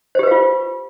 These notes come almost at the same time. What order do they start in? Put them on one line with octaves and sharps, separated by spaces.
C5 G4 B4 F5 F4